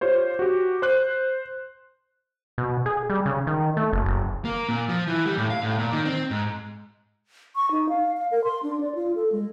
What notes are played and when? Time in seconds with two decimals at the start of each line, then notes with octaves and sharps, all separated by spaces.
0.01 F4 G4 C5 C#5
0.39 F#4 G4
0.82 C5 F#6
2.58 B2
2.86 G#4
3.10 G3
3.26 C#3
3.47 D#3
3.77 A3
3.93 F#1
4.06 F#1
4.45 A#3
4.69 A#2
4.89 F3
5.08 E3
5.26 G3
5.37 A2
5.50 F5
5.63 A2
5.78 A#2
5.92 D#3
6.05 C4
6.31 G#2
7.56 C#6
7.71 D#4
7.89 F5
8.17 F5
8.31 A#4
8.44 C6
8.63 D4
8.81 D5
8.95 F4
9.16 A4
9.32 G#3